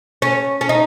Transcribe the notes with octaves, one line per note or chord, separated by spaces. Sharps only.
C#4
C#4
D#4